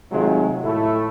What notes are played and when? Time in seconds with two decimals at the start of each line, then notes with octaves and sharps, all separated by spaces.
0.12 C3 D#3 F#3 G#3 A3 F4
0.64 A2 A3 E4